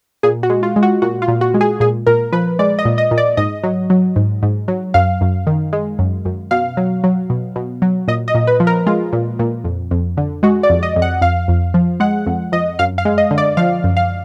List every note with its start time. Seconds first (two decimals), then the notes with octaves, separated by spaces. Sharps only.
0.23 A#2 G#4
0.43 F#4
0.50 G#3
0.63 F4
0.76 G#3
0.83 F#4
1.02 A#2 F#4
1.22 F4
1.28 A#2
1.41 F#4
1.54 G#3
1.61 G#4
1.80 A#2 G#4
2.07 A#2 A#4
2.32 F3 B4
2.59 G#3 D5
2.79 D#5
2.85 A#2
2.98 D#5
3.11 A#2
3.18 D5
3.37 G#2 D#5
3.64 F#3
3.90 F#3
4.16 G#2
4.43 G#2
4.68 F#3
4.94 F#2 F5
5.21 F#2
5.47 D#3
5.73 G#3
5.99 F#2
6.25 F#2
6.51 B2 F5
6.77 F#3
7.04 F#3
7.30 B2
7.56 B2
7.82 F#3
8.08 A#2 D#5
8.28 D#5
8.35 A#2
8.47 B4
8.60 F3
8.67 A#4
8.86 G#3 F4
9.13 A#2
9.39 A#2
9.64 F2
9.91 F2
10.17 D3
10.43 G#3 F#4
10.63 D5
10.69 F2
10.83 D#5
10.96 F2
11.02 F#5
11.21 F2 F5
11.48 F2
11.74 F3
12.00 G#3 F#5
12.26 F2
12.52 F2 D#5
12.79 F#2 F5
12.98 F5
13.05 G#3
13.18 D#5
13.31 D3
13.38 D5
13.57 F3 F5
13.84 F#2
13.97 F5